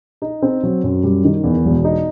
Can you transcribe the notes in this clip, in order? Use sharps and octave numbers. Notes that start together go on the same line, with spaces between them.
D#4
C4
F#3
F#2
G3
D#3
E2
E1
D#4